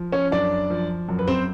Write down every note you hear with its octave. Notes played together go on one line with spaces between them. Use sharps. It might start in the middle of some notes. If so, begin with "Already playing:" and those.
Already playing: F3
C#4 C#5
F#2 D4 D5
F3
F#2
B4
C4 C5